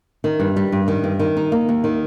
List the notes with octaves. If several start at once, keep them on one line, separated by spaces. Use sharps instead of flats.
D#3
G2
G3
G2
D#3
G2
D#3
D#4
A#3
D#2
D#3